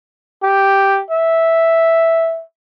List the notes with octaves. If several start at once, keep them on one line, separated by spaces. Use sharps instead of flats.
G4
E5